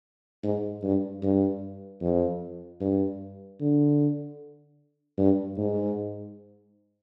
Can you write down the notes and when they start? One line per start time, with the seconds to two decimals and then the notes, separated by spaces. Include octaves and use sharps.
0.44 G#2
0.83 G2
1.23 G2
2.02 F2
2.81 G2
3.60 D3
5.18 G2
5.57 G#2